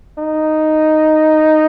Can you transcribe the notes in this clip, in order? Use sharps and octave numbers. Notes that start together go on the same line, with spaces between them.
D#4